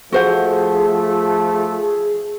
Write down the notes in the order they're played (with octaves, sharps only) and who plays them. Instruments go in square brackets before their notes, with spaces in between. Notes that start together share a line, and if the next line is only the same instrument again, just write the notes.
[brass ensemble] F3 A3 [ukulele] F#4 C5 F#5 [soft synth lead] G#4